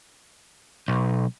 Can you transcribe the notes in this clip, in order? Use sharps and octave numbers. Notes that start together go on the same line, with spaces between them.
B1